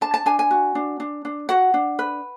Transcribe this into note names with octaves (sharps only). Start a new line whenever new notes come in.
D4 A5
A5
D4 G#5
G#5
F#4
D4
D4
D4
F#4 F#5
D4
B4